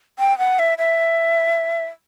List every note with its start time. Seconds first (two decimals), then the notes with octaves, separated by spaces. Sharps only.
0.19 G5
0.38 F#5
0.59 E5
0.78 E5